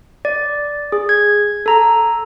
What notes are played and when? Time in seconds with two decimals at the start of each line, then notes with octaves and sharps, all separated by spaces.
0.25 D5
0.92 G#4
1.09 G#6
1.66 A4 A#5